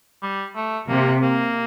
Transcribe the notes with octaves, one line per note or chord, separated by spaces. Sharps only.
G3
A3
C3 A#3
A#3